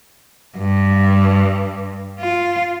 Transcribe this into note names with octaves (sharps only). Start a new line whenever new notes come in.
G2
F4